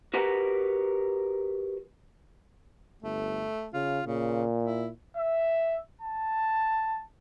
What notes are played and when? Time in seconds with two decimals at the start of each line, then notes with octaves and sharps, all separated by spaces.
0.14 F#4 G4 A#4 B4 F#5
3.03 G1 A3
3.74 C#3 F4
4.07 A#2 C#3
4.64 E4
5.17 E5
6.01 A5